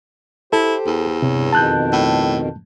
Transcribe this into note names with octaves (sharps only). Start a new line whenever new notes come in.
E4 G4 A4 C5
E2
G2 C3 C#5
F2 B2 D#3 A5 F#6 G6
A2